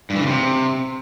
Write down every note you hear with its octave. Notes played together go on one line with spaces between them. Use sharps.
G2
E3
C#3
C3